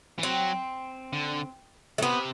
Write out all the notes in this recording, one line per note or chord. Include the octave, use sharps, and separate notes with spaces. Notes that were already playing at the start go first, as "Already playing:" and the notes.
E3
F#3 C4
D3
A3
C3 B3